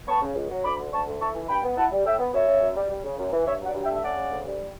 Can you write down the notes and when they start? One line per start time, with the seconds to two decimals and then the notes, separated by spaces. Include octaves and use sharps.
0.08 B3 A5 C#6
0.22 C#3
0.36 C#2
0.50 F#3
0.64 D2 B5 D6
0.79 D3
0.92 D2 A5 C#6
1.07 A3
1.21 E4 A5 C#6
1.35 E3
1.48 G2 G5 B5
1.63 B3
1.77 E4 F#5 A5
1.92 G3
2.05 A2 E5 G5
2.19 B3
2.34 F#2 C#5 E5
2.48 C#3
2.62 F#2
2.76 G3
2.90 G3
3.04 C#3
3.18 F#2
3.32 E3
3.46 G2 C#5 E5
3.61 F#3 D5 F#5
3.74 G2
3.84 E5 G5
3.89 A3
3.95 E5
4.03 C#4 D5 F#5
4.17 C#3
4.31 D2
4.46 G3